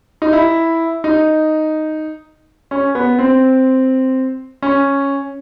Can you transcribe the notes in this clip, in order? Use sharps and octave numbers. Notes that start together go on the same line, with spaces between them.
D#4
E4
D#4
C#4
B3
C4
C#4